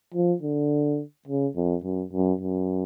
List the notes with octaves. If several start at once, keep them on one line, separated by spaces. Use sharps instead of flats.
F3
D3
C#3
F2
F#2
F#2
F#2